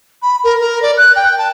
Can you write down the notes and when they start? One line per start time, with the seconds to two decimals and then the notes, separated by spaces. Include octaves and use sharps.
0.22 B5
0.44 A#4
0.60 A#4
0.82 D5
0.97 F#6
1.15 G5
1.38 A5